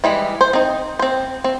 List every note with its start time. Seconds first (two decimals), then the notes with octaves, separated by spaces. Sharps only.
0.04 E3 G3 G#3
0.41 C5
0.53 C4 D#4
0.99 C4 C5
1.44 C4